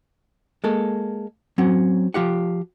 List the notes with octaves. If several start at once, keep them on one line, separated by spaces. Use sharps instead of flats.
G#3 A#3 A4
F#3 C4 C#4
F3 F4 G4 F#5